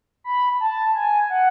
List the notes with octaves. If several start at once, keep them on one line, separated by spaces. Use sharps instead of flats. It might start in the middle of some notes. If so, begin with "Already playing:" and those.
B5
A5
G#5
F#5